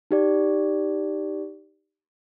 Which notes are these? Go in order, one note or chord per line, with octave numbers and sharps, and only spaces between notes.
D#4 G4 D5